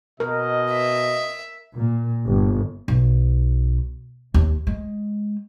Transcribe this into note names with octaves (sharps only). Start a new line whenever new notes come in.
B2 A#4 D#5
E5
A#2
G1
B1
D#2
G#3